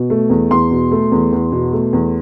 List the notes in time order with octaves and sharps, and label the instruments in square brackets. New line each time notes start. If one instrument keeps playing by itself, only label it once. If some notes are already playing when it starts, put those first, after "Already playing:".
Already playing: [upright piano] B2
A3
E2
E2 C6
B2
A3
E2
E2
B2
A3
E2